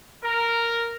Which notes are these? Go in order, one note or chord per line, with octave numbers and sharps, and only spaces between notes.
A#4